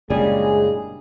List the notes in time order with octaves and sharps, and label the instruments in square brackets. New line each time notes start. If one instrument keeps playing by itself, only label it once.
[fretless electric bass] F#1 A#2 C#3 [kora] G3 D4 D5 [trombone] G#3 [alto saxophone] G#4